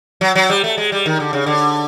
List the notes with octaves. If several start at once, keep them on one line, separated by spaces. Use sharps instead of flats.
F#3
F#3
G3
A3
G#3
G3
D#3
D3
C#3
D3